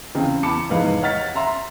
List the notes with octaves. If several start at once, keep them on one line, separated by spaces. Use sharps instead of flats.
E2 C#3 C4
E2 A5 B5 D6 C#7
F1 E2 G#2 G#3 B4 F5
C#5 D#5 F#5 F6 A6 B6
E5 A#5 C6